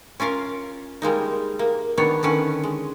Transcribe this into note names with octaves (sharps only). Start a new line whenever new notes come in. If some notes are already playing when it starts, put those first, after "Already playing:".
C#4 F4 A#4 F5
G3 G#3 A#3 D#4
A#3
D#3 B3 D4 C#5
D3 D#3 C#4 B4
G#3